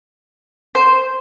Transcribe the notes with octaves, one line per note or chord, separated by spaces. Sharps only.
C5